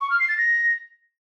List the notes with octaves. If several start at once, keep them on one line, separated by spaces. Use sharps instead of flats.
C#6
F6
C7
A6
A#6